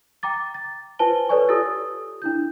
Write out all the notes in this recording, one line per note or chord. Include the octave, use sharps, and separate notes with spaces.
G5 A#5 D6 A6
A6
F4 B4 C5 G#5 A5 G7
A4 B4 C#5 D5 G#5 C#6
F4 G4 A4 D#6 E6 A6
D4 E4 G6